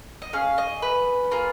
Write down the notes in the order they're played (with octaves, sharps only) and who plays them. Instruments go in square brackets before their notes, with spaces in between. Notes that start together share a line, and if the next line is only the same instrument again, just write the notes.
[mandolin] D#5
C#4 G#4 F5
D#5
B4
A#3 F4 G#4